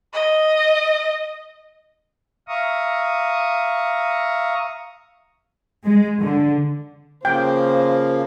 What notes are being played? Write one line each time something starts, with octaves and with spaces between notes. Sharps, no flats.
D#5
E5 F5 A#5 C#6 D#6
G#3
D3
C#3 F3 A#3 C5 G5